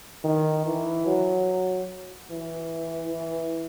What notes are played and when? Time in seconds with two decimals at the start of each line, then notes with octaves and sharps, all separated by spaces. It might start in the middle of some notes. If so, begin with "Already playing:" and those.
0.24 D#3
0.66 E3
1.06 F#3
2.30 E3
3.12 E3